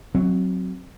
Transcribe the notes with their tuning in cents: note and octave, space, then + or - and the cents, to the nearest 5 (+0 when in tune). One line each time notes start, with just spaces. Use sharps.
F#3 +0 C4 +15